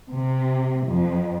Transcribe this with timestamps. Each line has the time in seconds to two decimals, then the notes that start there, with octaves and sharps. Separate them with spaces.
0.11 C3
0.88 F2